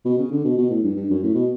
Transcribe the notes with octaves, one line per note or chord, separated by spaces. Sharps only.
B2
C#3
D3
B2
B2
A2
G2
G2
F#2
A2
B2